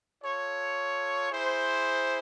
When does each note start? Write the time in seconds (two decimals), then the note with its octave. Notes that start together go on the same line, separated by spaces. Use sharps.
0.22 F4 A4 C#5
1.31 E4 G#4 C5